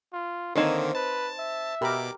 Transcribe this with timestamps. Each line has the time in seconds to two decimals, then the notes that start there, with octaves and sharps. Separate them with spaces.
0.13 F4
0.56 D3 D#3 A#3 C4 D#4 C5 C#5
0.95 B4 A5
1.39 E5
1.81 B2 G4 A#4 B5 D6